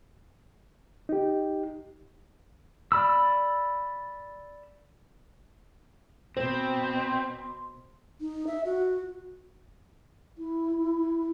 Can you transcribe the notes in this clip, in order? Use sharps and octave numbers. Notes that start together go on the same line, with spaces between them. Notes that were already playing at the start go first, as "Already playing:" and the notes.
D#4 G4
D5 B5 E6
B2 C4 C5 C6
D#4
E5
F#4
E4